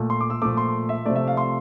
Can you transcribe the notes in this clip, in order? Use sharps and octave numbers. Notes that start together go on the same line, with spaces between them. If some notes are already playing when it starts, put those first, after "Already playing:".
Already playing: A#2 A3
C6
D6
E6
A#2 F3 A3 D6
C6
E5
C3 F3 A3 D5
E5
F5
C6